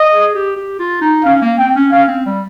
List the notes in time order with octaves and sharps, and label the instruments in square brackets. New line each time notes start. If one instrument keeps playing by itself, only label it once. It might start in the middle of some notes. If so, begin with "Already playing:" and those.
Already playing: [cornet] D#5
[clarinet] G#4
G4
G4
F4
D#4
[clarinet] C#4 [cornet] F5
[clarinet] A#3
[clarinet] C4 [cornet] G5
[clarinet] C#4
[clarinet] C#4 [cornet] F5
[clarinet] C4
G3